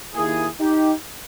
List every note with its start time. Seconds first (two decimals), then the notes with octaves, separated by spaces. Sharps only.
0.15 D#2 D#3 A#3 E4 G#4
0.60 D#4 G4